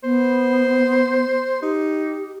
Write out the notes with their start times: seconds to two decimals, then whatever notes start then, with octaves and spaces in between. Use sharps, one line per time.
0.04 B3 C5
1.62 D#4 G4